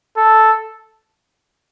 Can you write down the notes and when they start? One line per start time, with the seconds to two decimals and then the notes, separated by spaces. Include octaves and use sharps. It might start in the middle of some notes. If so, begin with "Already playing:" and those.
0.17 A4